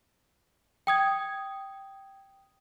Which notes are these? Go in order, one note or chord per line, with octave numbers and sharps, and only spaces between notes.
G5 D#6 G#6